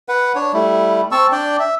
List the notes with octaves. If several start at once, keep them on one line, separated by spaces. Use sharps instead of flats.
B4 F#5
D4 C#5
G3 A3 E4
C4 A5 C#6 E6
D4 D5 G5
E5